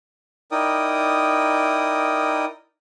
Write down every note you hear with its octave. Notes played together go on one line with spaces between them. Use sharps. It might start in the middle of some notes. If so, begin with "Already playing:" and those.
D#4 E4 A#4 D5 G5 D#6